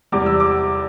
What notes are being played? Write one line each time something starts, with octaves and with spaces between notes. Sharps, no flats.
E2 C3 G3 D6
E6
D6